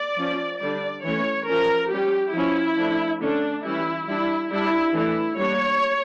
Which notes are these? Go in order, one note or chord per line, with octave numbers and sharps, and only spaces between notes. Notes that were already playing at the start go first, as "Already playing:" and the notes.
Already playing: D5
F3 C#4
D3 G3 D4 D5
E3 A3 C#4 C#5
F3 C#4 A#4
G3 C#4 G4
F3 C#4 E4
F3 A3 D4
D3 A3 C#4 D4
E3 G3 C#4 E4
G3 D4 E4
G3 D4 E4
E3 A3 D4 E4
G3 A#3 D4 C#5